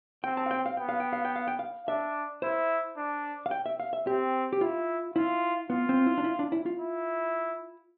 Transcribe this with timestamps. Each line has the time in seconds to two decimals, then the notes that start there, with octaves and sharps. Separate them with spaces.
0.24 C4 G5
0.37 A5
0.46 F5
0.51 G5
0.66 F5
0.77 B3 G5
0.89 F5
1.00 G5
1.13 F5
1.25 G5
1.36 F5
1.48 G5
1.59 F5
1.88 D4 E5
2.42 E4 C5
2.97 D4
3.46 F5
3.51 G5
3.66 E5
3.80 F5
3.93 E5
4.07 C4 G4
4.53 G4
4.61 E4 F4
5.16 E4 F4
5.70 B3 F4
5.89 C4
6.06 E4
6.18 D4
6.24 E4
6.39 D4
6.52 E4
6.66 F4
6.80 E4